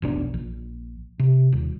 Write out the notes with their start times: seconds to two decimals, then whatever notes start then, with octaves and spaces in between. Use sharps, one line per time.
0.02 F1 B1 D4
0.34 A#1
1.20 C3
1.53 D#1